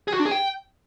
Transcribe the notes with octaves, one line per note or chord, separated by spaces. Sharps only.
G#4
F#4
D4
G#4
G5